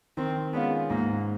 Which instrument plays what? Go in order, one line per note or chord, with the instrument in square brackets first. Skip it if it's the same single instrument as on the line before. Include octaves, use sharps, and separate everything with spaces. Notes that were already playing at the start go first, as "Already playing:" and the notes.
[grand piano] D#3 [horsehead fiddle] C4
[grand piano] G#3 C#4 F4 [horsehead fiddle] B3
[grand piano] G#2 [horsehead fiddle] A#3